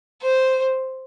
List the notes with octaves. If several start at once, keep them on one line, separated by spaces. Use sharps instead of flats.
C5